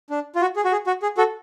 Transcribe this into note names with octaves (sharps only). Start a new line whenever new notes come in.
D4
F4
F#4
G#4
F#4
G#4
F#4
G#4
F#4 A4